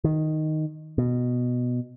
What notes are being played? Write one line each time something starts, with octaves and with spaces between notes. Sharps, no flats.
D#3
B2